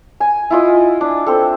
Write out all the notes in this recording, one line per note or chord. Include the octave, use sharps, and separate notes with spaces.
G#5
E4 F4 D#5
D4
C4 A4